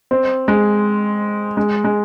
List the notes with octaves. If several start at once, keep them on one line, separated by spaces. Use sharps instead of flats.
C4
G#3
G#3
G#3